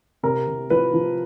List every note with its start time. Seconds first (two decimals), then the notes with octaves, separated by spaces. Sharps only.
0.23 C3 A#4
0.47 C3
0.70 F3 B4
0.94 F3